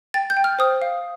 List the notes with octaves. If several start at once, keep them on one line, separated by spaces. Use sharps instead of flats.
G5 A6
G6
G5
F6
C5 D#6
F5